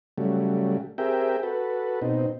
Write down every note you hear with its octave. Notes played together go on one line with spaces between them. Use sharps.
C#3 F#3 G3 A3
C4 G4 G#4 A#4 E5 G5
F#4 A4 B4
B2 C4 D#4